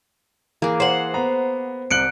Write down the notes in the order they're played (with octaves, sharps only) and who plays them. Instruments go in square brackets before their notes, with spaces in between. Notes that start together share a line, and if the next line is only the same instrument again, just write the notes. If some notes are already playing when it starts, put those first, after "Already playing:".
[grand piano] E3 [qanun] A#3 G#4
[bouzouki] C5 F#5
[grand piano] B3 A#5
[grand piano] C2 C3 F#7 [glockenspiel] F#6 C#7 D7